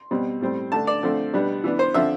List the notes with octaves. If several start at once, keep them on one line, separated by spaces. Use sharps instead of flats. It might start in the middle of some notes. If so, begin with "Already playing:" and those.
Already playing: C6
B2 G3 C4
A2 G3 C4
D3 A3 D4 A5
D5
D3 F3 A3 C4
B2 G3 B3 D4
E3 B3 D4
C5
D3 F3 C4 E5